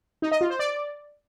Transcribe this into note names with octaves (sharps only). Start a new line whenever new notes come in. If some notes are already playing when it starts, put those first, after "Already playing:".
D#4
D#5
F4
C5
D5